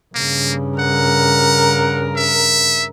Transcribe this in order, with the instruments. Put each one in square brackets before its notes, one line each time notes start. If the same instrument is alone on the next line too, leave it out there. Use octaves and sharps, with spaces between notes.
[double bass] G2 C#3 [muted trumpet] A#3
[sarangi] A#4 [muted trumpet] F#5
[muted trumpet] E5